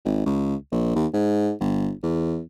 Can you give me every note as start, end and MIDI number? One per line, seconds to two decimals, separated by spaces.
0.05 0.22 32
0.26 0.55 37
0.72 0.93 34
0.96 1.07 39
1.14 1.52 44
1.60 1.92 31
2.03 2.42 40